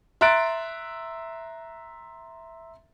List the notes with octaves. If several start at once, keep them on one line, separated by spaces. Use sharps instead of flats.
E5 A#5 C6 F#6 A6 D7